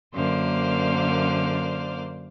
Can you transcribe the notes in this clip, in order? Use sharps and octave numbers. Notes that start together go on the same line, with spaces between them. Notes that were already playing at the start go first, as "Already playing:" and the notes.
F#2 D3 A#3 C5 D5 F5